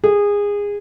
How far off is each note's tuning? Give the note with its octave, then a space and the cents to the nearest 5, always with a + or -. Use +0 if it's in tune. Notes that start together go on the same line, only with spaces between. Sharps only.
G#4 -25